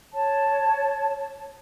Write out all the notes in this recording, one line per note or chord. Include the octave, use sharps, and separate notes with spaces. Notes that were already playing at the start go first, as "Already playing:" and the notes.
C#5 A5